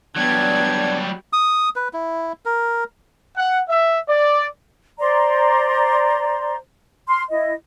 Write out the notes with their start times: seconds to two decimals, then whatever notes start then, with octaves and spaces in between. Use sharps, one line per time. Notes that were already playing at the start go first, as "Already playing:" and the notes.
0.17 F#3 G3 B3 D4 G#6
1.33 D#6
1.76 B4
1.93 E4
2.45 A#4
3.36 F#5
3.69 E5
4.09 D5
4.99 C5 D5 A#5 C6
7.08 C6 F6
7.30 E4 D#5